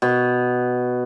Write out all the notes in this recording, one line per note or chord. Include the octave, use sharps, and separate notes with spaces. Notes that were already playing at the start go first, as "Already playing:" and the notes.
B2